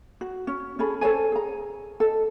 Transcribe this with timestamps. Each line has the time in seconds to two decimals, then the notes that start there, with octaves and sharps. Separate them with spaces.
0.21 F#4
0.47 C#4
0.79 C#4 G#4 A4 B5
1.01 A4 C5 C#5 G#5
1.32 G#4 A#5
2.00 A4 D#5